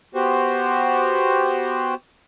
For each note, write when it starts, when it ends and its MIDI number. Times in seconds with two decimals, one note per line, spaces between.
0.15 1.94 59
0.15 1.94 66
0.15 1.94 67
0.15 1.94 72